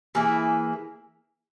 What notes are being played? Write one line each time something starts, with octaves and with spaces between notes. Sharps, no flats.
E3 A#3 E4 G#4